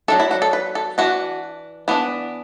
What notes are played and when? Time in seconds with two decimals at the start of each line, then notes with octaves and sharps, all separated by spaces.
0.08 F#3 A3 D4 A4
0.20 E4
0.31 F#4
0.42 A4
0.53 B4
0.75 A4
0.98 E3 D4 F#4
1.88 E3 B3 D4